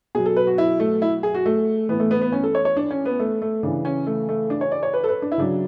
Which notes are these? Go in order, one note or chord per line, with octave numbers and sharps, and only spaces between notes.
B2 F#3 G#4
A4
B4
F#4
E4
A3
E4
G#4
F#4
A3
A2 E3 B3
A3
B3
B3
C#4
A4
C#5
C#5
D4
C#4
B3
A3
A3
C#3 E3 D4
C#4
A3
A3
D4
C#5
D5
C#5
B4
A4
B4
D4
E4
C#3 F#3 D4